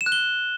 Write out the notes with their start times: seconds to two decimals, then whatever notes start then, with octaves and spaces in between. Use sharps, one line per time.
0.01 E7
0.06 F#6
0.12 G7